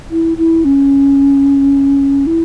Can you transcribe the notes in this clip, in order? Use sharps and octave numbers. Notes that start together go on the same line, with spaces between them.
E4
E4
C#4
E4